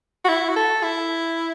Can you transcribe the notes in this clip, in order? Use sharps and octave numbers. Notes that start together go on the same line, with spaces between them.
F#4
E4
F#4
A4
E4